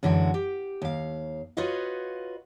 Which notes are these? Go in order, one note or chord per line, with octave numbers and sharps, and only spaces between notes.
F#2 D3 E3 G#3 F#4
G4
D#2 F5
F4 F#4 B4 C#5 D#5 F5